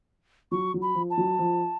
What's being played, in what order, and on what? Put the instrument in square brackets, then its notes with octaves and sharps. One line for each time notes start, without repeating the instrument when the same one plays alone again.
[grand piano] F#3 [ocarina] C#6
[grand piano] F#3
[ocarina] B5
[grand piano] F3
[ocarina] A5
[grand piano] F#3
F3